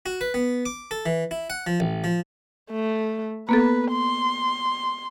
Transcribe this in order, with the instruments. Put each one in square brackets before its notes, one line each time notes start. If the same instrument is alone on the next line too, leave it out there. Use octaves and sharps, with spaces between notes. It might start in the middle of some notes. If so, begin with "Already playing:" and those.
[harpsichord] F#4
B4
B3
D6
A4
E3
E4
F#5
F3
A1
F3
[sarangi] A3
[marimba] A#3 B3 A4 [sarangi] B4
[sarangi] C6